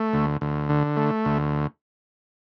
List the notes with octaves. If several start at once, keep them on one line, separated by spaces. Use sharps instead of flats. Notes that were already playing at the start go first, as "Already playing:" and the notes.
Already playing: A3
D2
D2
D3
A3
D2